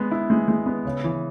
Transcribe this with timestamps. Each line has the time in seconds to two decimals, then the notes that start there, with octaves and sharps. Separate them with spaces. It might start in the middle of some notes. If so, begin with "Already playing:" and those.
Already playing: G#3 B3
0.11 E4
0.30 G#3
0.48 G#3
0.66 B3
0.85 C#3
1.04 E3